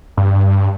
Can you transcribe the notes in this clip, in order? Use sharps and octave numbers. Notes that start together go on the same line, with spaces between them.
G2